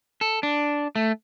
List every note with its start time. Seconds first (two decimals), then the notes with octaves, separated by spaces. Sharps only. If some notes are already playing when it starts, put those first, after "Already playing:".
0.21 A4
0.43 D4
0.96 A3